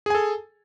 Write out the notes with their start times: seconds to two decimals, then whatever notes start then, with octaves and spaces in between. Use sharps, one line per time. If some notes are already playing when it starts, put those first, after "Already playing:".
0.06 G#4
0.10 G#5
0.15 A4